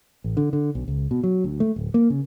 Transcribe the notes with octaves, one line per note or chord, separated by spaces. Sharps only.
A1
D3
D3
B1
C#2
B2
F#3
D2
A3
D1
A#3
C#3